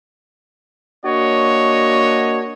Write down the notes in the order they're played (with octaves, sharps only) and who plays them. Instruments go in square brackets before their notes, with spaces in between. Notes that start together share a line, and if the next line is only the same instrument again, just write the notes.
[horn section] A#3 D4 F#4 C#5 D#5